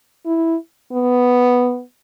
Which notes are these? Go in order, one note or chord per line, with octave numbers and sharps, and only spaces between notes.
E4
B3